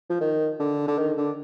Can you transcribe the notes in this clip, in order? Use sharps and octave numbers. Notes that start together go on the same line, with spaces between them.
F3
D#3
D3
D3
D#3
D3